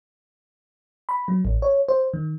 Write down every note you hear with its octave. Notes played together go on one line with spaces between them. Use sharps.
B5
F#3
A1
C#5
C5
D#3